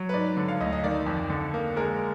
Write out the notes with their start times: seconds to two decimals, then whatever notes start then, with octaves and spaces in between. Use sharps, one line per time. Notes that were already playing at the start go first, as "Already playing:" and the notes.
Already playing: F#3
0.09 B4
0.14 G#2 D5
0.37 D3
0.48 F5
0.61 D2 D#5
0.73 D#5
0.84 D#3 D5
1.06 F2
1.30 D3
1.54 A#3
1.76 G#3 A#4